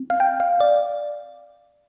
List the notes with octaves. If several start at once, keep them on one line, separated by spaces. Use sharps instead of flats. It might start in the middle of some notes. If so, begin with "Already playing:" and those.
Already playing: C4
F5
G5
F5
D5